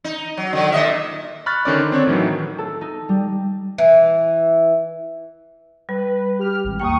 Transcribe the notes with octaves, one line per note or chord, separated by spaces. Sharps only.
D#4
F#3
D3 D#3 F#3
A#2 D#5 E5
B5 C#6 F6 F#6 A6
D3 D#3 C#4 D5
C5
C4 D4 C#5
A2 D#3 E3 F#3
A4
D#4
G3
E3
G3 B4
G4 F6
G#1
D#2 A#3 G5 C#6 D#6